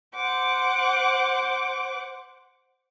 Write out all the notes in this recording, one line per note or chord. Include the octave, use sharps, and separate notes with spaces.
C5 F#5 D6